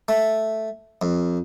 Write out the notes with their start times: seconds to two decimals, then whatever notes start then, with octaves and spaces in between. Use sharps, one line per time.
0.08 A3
1.02 F2